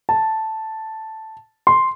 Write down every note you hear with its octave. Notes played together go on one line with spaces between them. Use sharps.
A5
C6